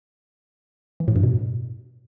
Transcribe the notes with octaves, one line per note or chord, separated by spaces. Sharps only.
E3
A2
G2
B2